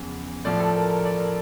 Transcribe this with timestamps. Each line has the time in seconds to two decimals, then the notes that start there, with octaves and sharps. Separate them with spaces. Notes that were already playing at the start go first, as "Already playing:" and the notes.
Already playing: E2 C#3 F3
0.45 A2 F3 D5
0.60 A4
0.76 A#4
0.90 A#4
1.05 D5
1.19 A#4